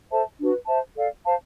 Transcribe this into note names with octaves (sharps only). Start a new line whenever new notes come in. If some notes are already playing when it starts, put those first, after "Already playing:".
A4 C5 E5 A5
D4 F#4 B4
C5 E5 A5
A4 D5 F5
C5 F5 A5